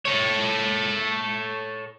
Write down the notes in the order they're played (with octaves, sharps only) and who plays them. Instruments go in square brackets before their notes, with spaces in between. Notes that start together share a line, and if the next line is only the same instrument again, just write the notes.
[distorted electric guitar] A4 C#5